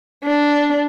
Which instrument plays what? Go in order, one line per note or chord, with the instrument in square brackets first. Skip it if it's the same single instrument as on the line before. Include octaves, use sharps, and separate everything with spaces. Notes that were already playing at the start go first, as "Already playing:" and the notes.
[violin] D4